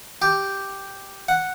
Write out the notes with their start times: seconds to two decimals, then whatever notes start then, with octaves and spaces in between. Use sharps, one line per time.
0.22 G4
1.28 F#5